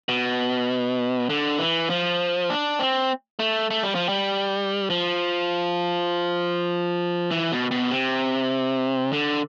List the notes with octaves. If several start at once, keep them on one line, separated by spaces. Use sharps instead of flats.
B2
D3
E3
F3
D4
C4
A3
A3
G3
F3
G3
F3
E3
B2
B2
C3
D3